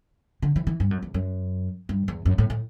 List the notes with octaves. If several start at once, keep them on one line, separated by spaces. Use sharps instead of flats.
D3
E3
E3
G2
F#2
E2
F#2
G2
E2
F#2
A2
A2